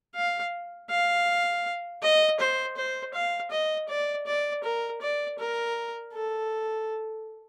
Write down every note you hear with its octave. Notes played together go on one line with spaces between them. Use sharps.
F5
F5
D#5
C5
C5
F5
D#5
D5
D5
A#4
D5
A#4
A4